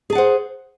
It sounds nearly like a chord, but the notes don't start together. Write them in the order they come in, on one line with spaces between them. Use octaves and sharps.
G#4 A5 F#5 C5